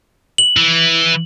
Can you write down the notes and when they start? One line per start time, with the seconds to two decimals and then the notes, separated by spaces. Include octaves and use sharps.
0.38 F#7
0.57 E3